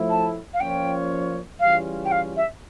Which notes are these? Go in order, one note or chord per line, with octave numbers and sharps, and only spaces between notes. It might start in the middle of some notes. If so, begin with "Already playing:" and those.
Already playing: A2 F3 A3 E4
A5
F5
A#2 F3 C#4 F4 C#5 G5
C#3 E3 G3 C#4 F4 F5
G5
F5
E5